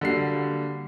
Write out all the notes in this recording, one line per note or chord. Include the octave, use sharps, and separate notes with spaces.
D3 G3 A#3 F#4 C7